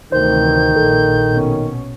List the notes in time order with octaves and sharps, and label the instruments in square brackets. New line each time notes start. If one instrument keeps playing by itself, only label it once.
[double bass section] D2 C3 E3 [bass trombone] D#3 [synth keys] C5 [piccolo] G6
[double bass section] A#1 A#2 [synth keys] A4
[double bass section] B2 C#4